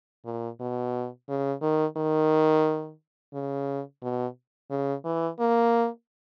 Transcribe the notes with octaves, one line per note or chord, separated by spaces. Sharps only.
A#2
B2
C#3
D#3
D#3
C#3
B2
C#3
E3
A#3